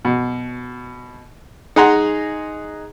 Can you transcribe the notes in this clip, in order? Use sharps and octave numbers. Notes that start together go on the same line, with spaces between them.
B2
D#4 G#4 F#5 A#5 C6